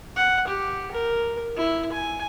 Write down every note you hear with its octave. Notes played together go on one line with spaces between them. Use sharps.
F#5
G4
A#4
E4
G#5